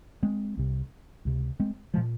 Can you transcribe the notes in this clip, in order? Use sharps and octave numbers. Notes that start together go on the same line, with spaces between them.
G#3 C4
C2 C3
C#2 C3
G#3 C4
F3 G#3
A#2